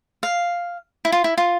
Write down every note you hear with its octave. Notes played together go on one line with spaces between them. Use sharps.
F5
E4
F4
E4
F4